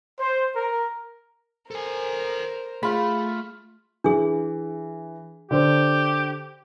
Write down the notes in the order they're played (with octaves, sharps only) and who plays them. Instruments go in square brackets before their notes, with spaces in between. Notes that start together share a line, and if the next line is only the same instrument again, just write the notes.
[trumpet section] C5
A#4
[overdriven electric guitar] A4 G#5 [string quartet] A#4 C5
[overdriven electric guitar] A3 [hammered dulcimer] F4 B5 [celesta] G#4
[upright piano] E3 [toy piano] D4 G#4
[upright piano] D3 C5 [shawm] G4